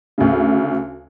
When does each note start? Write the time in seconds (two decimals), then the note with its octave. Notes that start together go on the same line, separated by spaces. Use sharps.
0.18 D2 C#3